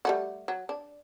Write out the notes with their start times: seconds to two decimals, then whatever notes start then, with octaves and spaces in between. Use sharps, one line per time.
0.05 G3 A3 F#4
0.48 F#3
0.69 D4